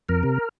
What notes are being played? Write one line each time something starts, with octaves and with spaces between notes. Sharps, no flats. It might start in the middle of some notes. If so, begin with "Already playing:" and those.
F2 A#4
C3